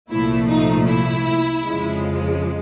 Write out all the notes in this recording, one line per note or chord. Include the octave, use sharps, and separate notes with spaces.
C2 A#2 F3 A3 E4
D#4
E4
F2 C#3 F3 G#3